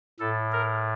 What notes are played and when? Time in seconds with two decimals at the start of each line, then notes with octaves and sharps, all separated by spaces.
0.20 A2 A4
0.52 A#4